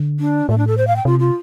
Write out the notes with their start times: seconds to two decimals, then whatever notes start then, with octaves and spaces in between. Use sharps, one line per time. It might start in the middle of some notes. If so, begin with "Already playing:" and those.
Already playing: D3
0.20 D4
0.49 A2 A3
0.58 D4
0.67 A4
0.78 C5
0.87 F5
0.96 G5
1.05 C3 F4
1.19 F4